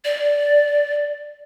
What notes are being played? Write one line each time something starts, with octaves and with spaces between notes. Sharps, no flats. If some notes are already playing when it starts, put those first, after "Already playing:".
D5